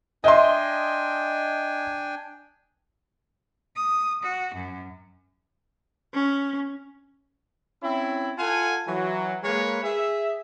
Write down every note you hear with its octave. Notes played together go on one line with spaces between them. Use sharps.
D4 D#5 E5 G5 G#5 C6
D#6
F#4
F#2
C#4
C4 C#4 E4
F4 A4 F#5 G#5
E3 F#3
G#3 A#3 A#4 B4 C#5
G#4 E5